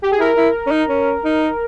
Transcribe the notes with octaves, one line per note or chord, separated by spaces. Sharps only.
G4
G#4
E4 A#4
E4
C#4
D#4
C#4
D#4